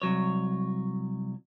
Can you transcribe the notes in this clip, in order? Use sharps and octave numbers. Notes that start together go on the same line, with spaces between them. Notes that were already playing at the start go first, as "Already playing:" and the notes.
C2 F#3 C#5